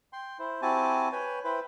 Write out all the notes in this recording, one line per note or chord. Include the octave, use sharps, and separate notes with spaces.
G5 C6
E4 C5
C4 E4 F#4 G4 G#5 A5
B4 C#5 G5 G#5
E4 B4 C5 G5